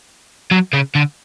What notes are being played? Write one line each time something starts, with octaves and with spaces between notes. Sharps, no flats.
F#3
C#3
D3